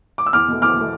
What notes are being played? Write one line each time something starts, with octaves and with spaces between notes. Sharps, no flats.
D6
E6
E2 D6 F6
B2 A3
E2 D6 F6
B2 A3